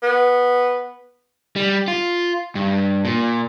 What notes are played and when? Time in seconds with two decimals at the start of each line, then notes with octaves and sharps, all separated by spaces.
0.03 B3
1.56 G3
1.88 F4
2.55 G2
3.05 A#2